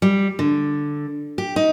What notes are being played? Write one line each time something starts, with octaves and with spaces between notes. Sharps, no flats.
G3
D3
G4
D#4